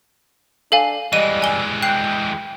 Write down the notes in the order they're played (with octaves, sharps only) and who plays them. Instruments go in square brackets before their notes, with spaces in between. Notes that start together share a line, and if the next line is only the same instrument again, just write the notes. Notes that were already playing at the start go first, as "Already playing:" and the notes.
[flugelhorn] D4 [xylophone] A4 F5 G#5
[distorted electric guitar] E3 G#3 [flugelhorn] G3 [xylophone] D#5 D#7
[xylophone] G#5 G7
[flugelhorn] G5 [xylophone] F#6 C7